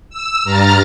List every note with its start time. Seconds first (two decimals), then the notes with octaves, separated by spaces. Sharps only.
0.10 E6
0.44 G2 A#5 F6 A6